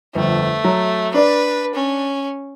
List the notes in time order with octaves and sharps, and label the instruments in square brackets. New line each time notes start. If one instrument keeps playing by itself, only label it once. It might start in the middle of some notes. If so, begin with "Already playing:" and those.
[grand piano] G1 F2 [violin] A3
[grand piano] F#3
[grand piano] D4 D5 [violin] B4
[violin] C#4